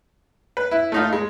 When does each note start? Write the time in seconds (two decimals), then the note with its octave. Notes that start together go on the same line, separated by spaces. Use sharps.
0.57 B4
0.71 E4
0.92 A3 D#4 F4
1.13 G#3